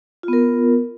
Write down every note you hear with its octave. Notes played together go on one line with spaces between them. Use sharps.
B3 F4 A#4